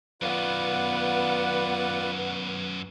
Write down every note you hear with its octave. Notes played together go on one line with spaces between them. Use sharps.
F#2 D#3 B3 F4 B4 D5 F#5